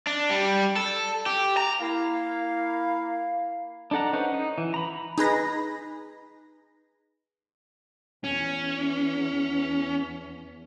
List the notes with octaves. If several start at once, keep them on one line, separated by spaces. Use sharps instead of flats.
D4
G3
A4
G4
A#5
A#3 E4 F5
D4 D#4 A4 F#5 A#5
C#4 D#4 B4 C5 F#5
D#4
E3
A#5 B5
D#4 G#4 B4 A#6
E2 C#4